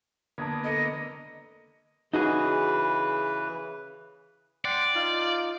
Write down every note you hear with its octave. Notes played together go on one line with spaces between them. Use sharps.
D3 A#3 B3 A5 D#6 G#6
A4 D#5 C#7
C#3 E3 D#4 F#4 G#4 B4
D5 F#5 G5 C6
D#4 F4 F5